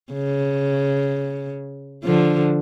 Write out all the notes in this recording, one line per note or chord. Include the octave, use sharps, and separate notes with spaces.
C#3
D3 F3